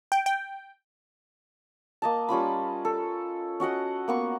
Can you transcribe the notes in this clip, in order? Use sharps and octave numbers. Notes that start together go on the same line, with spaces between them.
G5
G5
A#3 D#5 A5
G3 C#4 F4 B5
A4
C#4 F#4 D#5 F#5
A#3 B3 C#6